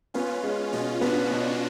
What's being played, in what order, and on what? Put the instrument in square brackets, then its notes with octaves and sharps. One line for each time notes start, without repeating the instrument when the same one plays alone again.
[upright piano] B3 [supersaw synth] C#4 F4
[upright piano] G#3
[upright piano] B2 [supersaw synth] C#4 F4
[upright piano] B3 [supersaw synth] D4 F#4
[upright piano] B2